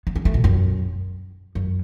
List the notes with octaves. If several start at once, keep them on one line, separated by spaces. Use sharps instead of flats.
B3
C#4
A3
B2
F#2
F#2